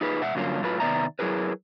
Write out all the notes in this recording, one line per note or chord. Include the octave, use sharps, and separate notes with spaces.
D#4 F4 G#4 B4
B2 E5 F#5
G2 D3 F#3 A#3 C#4 F4
A2 F#3 A3 F4 B4
C3 D#3 B3 D5 E5 A#5
F#3 E4 G#4 A#4 B4